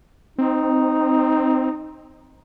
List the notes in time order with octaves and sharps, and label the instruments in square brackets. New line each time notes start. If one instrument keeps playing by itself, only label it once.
[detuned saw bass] C4 [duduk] D#4